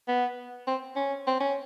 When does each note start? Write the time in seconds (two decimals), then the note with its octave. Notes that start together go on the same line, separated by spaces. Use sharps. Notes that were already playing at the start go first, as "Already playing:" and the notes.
0.08 B3
0.67 C4
0.96 C#4
1.27 C4
1.40 C#4